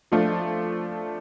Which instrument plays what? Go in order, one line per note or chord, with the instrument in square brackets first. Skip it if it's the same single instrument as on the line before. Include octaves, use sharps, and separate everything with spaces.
[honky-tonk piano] F3 A3 D4 F4